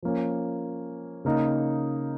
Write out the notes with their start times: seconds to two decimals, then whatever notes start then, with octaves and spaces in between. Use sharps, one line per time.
0.03 F3 A#3 C#4
1.25 C#3 A#3 D#4